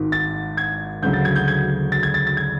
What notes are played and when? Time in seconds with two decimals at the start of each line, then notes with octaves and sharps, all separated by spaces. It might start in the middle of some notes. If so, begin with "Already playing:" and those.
Already playing: G#1 G#2 D#3
0.12 A6
0.57 G#6
1.02 D2 C#3 F#3 G6
1.13 A6
1.25 G#6
1.36 G6
1.48 G#6
1.92 A6
2.03 G#6
2.14 A6
2.27 A6
2.37 G#6